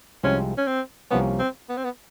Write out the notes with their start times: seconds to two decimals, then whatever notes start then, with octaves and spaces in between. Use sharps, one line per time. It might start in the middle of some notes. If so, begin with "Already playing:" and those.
0.23 C2 C3 F3 G#3 C4 C#4
0.58 C#4
0.67 C4
1.11 C2 C3 F3 A#3 B3 C#4
1.39 C4
1.69 B3
1.77 C4
1.84 B3